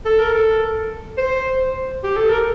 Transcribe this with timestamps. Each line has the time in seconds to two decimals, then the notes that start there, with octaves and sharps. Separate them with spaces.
0.06 A4
0.19 A#4
0.33 A4
1.18 C5
2.04 G4
2.17 A4
2.30 A#4